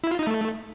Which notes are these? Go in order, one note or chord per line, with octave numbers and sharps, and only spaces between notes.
E4
F4
D#4
A3